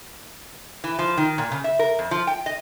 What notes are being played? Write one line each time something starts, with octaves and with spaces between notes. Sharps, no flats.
E3
F3
D#3
A#2
C#3
E5
A#4
F2
F3
G5
D#5